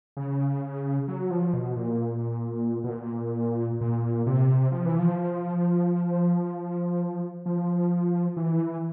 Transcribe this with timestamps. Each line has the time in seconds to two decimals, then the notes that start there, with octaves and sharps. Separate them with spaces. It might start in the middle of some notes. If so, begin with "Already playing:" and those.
0.17 C#3
1.08 F#3
1.30 F3
1.53 B2
1.75 A#2
2.84 B2
2.89 A#2
3.81 A#2
4.26 C3
4.72 F3
4.86 E3
4.99 F3
7.46 F3
8.37 E3